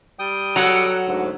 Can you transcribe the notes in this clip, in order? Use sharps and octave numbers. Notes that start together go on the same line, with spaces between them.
G3 G5 D#6
F#3 A4 F#5 A#5
D2 G#2 D3